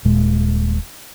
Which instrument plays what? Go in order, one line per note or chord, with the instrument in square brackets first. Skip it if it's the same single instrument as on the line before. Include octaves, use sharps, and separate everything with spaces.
[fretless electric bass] D#1 A#2 G#3